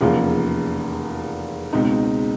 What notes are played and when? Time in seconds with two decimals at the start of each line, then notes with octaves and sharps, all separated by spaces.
0.01 F1 E2 C#3 F3 A#3
1.73 C#2 B2 G#3 C4 D#4